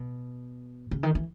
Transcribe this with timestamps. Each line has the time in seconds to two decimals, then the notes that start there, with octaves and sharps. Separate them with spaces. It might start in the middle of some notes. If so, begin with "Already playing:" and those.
Already playing: B2
0.91 C#3
1.03 D#3
1.15 E3